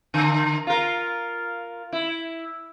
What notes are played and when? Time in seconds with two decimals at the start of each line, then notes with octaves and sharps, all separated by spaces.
0.14 D3
0.67 F4 A#4
1.92 E4